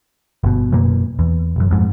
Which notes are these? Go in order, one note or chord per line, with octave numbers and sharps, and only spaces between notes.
G1 B2
F#2 B2 A#3
E2
E1 F#2
F2 G#2